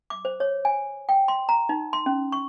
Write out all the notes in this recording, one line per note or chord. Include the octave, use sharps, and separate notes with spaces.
D6
C5
C#5
G#5
G5
C6
A#5
D#4
C6
C#4
C#6